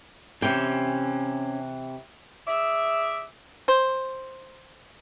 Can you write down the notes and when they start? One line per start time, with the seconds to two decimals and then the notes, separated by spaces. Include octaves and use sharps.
0.42 C3 E3 C#4 G5
2.47 G#4 D5 E5
3.68 C5